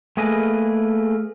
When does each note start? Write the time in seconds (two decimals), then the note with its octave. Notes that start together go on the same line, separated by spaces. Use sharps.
0.17 A3 A#3 G#4 B4 D#5